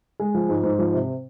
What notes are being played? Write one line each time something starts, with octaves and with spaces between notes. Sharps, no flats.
G#3
F3
G#2
G#2
F3
C3